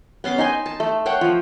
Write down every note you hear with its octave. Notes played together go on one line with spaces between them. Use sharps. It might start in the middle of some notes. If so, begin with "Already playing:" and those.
B3 C#4 C6 D6
D#4 C5 G#5 C6
A5
A3
C5 C#5 F#5 G5
F3